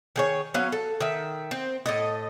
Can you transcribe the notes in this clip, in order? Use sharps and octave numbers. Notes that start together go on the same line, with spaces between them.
D#3 G#4 C#5
F#3 B3 C#4 F5
A4
D#3 E5
C4
A2 A4 D#5